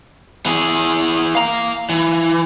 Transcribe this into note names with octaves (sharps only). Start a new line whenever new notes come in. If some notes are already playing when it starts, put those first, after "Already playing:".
E3 G#4
F5 A#5
E3